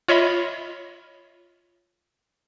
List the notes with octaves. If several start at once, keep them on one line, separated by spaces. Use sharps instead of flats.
F4 C#5 D#5 E5 B5